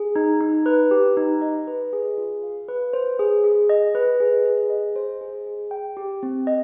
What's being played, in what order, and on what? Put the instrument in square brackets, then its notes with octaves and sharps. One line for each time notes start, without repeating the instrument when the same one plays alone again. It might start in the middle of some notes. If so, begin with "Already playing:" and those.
Already playing: [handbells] G#4
D#4
D#4
B4
G4
D#4
D#5
B4
G#4
F4
F5
B4
C5
G#4
G#4
D#5
B4
G#4
G#4
D#5
C5
G#4
G#4
G5
G4
C4
D#5